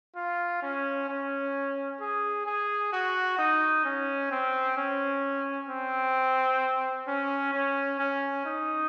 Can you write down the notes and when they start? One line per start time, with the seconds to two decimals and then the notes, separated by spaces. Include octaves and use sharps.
0.16 F4
0.62 C#4
1.09 C#4
2.00 G#4
2.46 G#4
2.92 F#4
3.38 D#4
3.84 C#4
4.31 C4
4.77 C#4
5.69 C4
7.07 C#4
7.54 C#4
7.99 C#4
8.45 D#4